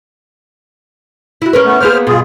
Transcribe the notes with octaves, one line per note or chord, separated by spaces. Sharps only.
E4 F#4
C#4 A#4 B4
A3 B3
A#3 B3 G#4 C5 F6
G2 B2 F4 G#4